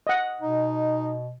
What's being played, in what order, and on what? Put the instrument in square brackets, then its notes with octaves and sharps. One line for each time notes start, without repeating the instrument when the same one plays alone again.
[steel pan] D#5 F#5
[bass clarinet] B2 [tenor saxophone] D#4